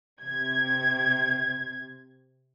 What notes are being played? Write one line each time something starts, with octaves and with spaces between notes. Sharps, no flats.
C3 G#6